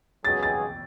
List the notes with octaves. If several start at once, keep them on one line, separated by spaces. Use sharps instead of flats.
C#2 B2 F#3 C#4 G#4 A6
A6